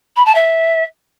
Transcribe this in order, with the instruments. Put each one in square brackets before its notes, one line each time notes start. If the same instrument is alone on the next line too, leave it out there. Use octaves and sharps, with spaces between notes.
[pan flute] B5
A5
E5